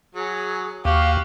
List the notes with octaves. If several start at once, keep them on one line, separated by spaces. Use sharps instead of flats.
F#3 G#4
D#2 F#4 G4 F5